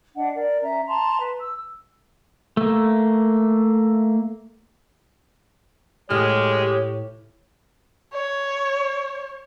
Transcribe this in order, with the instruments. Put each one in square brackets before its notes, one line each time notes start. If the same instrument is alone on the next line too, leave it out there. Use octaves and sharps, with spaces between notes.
[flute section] D4 D#5 F#5
A#4 D5
C#4 E5 A#5
A5 A#5 C6
B4
E6
[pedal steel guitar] A3 A#3
[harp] A2 F6 [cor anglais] G#3 [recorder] G4 [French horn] C#5
[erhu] C#5